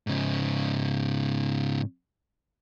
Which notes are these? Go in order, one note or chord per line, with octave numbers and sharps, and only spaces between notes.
G#2 C#3